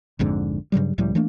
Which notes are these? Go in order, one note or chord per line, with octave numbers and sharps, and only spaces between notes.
A#1 F2 G#2 D3
G2 C#3 F#3 G3
C#2 A2 F3 G3
E3 A3 A#3 D4